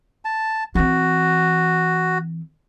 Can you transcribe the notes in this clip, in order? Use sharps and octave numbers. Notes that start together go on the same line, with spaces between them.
A5
E3 C4 F#4